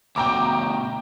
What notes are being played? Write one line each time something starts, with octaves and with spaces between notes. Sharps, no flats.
D2 B2 G5 A#5 D6